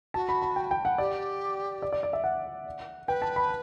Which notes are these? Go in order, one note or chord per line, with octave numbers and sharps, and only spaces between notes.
F#4 A5
B5
B5
G5
G5
F#5
G4 D5
D5
D5
D5
E5
F#5
B4 G5
A5
B5